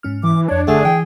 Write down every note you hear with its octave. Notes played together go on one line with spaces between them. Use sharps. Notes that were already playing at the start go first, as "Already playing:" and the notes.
G#2 C#4 F6
E3 D6
F2 D4 C#5 D6
G1 D3 A3 G#4 F#5
E3 G5